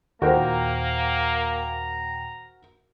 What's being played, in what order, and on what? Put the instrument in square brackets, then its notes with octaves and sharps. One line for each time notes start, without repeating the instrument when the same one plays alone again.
[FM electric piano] D#2 A#2 G5 [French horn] A#3 [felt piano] F#4 A#4 C5 [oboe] A#5